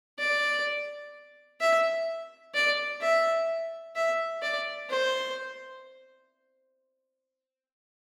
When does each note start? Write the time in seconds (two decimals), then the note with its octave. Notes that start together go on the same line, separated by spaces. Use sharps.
0.19 D5
1.61 E5
2.54 D5
3.01 E5
3.96 E5
4.42 D5
4.90 C5